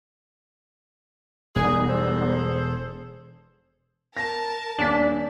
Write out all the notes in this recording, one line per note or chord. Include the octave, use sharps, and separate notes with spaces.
E1 G3 B3 D#4 G#4
G#4 A4 C5
A#4 A5 A#6
D#1 D4 B6